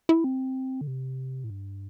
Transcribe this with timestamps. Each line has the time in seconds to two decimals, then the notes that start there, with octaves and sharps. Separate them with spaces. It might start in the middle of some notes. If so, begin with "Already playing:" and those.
0.09 E4
0.24 C4
0.81 D3
0.87 C3
1.44 A2
1.50 G2